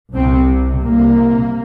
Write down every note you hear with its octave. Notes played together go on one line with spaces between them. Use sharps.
C2 C3 C4
C2 C3 A#3